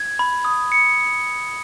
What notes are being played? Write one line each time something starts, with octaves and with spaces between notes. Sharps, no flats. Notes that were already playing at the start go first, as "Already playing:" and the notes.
Already playing: G#6
B5
D#6
C#7